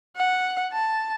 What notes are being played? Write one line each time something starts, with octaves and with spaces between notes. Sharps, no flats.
F#5
A5